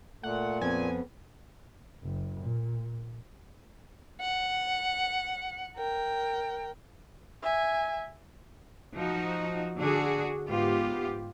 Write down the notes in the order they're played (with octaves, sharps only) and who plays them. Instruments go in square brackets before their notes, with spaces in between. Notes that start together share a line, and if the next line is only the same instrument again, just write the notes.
[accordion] A#2 [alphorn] A3 [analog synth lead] F#5
[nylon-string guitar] F2 [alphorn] B3 [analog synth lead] G#5
[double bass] F#1
A#2
[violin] F#5
A#4 G5
[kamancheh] E5 G#5
[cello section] F3 D#4 F#4
D3 D4 F#4 G#4
G#2 B3 F4 G4